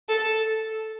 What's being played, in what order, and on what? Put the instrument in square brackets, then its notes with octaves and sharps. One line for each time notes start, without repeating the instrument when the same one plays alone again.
[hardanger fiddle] A4